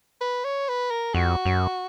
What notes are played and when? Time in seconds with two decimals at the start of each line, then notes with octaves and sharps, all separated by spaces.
0.21 B4
0.44 C#5
0.69 B4
0.91 A#4
1.14 F2 F#4
1.46 F#2